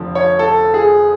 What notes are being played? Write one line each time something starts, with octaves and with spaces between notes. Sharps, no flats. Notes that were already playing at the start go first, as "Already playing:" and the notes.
Already playing: F1 D3 F3
C#5
A4
G#4